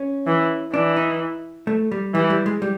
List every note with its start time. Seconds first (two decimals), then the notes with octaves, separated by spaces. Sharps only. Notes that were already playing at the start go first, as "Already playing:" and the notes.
Already playing: C#4
0.27 E3
0.74 E3 D4
0.96 D#4
1.67 A3
1.92 G3
2.14 E3 G3
2.30 G3
2.46 G#3
2.62 G3